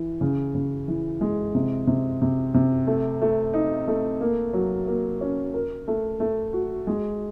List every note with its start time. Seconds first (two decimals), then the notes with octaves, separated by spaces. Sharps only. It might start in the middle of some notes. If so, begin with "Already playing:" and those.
Already playing: E3
0.21 C#3
0.55 C#3
0.88 E3
1.21 G#3
1.55 C3
1.87 C3
2.22 C3
2.54 C3
2.87 A3
3.21 A3
3.54 D#4
3.88 A3
4.21 A#3
4.53 F#3
4.87 A#3
5.21 C#4
5.54 A#4
5.88 A3
6.20 A3
6.53 F#4
6.87 G#3